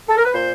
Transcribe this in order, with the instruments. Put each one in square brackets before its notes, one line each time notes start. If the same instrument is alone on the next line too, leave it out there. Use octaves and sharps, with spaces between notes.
[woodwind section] A4
A#4
B4
A#2 C5